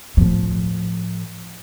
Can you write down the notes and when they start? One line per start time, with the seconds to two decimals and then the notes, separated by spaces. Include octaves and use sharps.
0.17 A2 F3